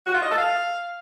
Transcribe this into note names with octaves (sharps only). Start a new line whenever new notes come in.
F#4
F4
D#5
A4
F5